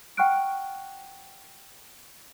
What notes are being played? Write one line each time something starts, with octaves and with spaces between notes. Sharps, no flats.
F#5 G5 C#6 F6 F#6 D7